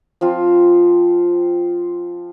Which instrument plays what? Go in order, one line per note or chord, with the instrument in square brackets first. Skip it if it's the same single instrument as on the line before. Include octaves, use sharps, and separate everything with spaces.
[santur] F3 C4 F4